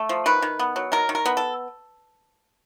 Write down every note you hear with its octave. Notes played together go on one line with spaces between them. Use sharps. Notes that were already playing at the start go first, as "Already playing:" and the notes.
Already playing: A3
F3
D#3 B4
D#3
B3
F#3
D#3 A#4
D#3
A#4
B3
A4